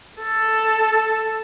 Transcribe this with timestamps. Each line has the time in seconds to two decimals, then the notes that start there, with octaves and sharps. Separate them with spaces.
0.20 A4